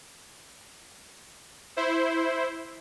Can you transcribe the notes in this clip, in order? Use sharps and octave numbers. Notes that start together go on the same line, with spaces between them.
E4 C5